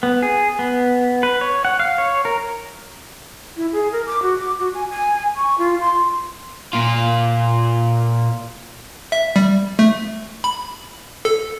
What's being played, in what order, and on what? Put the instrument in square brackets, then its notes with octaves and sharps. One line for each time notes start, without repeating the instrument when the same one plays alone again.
[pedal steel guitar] B3
G#4
B3
B4
C#5
F#5
F5
C#5
A#4
[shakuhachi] E4
G#4
A#4
D6
F#4
D6
F#4
G#5
G#5
C#6
F4
C6
[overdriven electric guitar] A#2 F4
[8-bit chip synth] E5
G3
A3
B5
A4